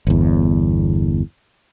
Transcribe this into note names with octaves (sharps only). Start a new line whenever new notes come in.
G1 E2